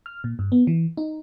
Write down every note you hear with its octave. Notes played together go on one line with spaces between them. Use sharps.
F6
A#2
G2
B3
E3
D#4